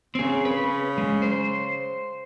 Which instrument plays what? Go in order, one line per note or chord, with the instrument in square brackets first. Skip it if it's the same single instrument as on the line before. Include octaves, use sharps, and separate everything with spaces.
[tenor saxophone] C#3 [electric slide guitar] C4 G#4
[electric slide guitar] B4
G#3
C5